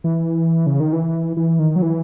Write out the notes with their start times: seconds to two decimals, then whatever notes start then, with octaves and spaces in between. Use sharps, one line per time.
0.04 E3
0.67 C#3
0.80 D#3
0.93 E3
1.37 E3
1.59 D#3
1.76 F#3
1.82 E3